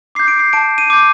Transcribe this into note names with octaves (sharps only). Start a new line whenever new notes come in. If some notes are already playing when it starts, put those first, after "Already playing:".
D6 G6 C7
D7
C7
A5 D7
D#7
D6 G6